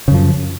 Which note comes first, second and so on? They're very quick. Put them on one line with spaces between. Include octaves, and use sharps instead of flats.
C#3 F#2 F3